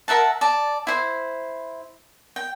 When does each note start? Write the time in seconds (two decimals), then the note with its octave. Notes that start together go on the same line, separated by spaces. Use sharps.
0.08 A#4 E5 F#5 A5
0.41 D5 A5
0.87 E4 C5
2.36 G5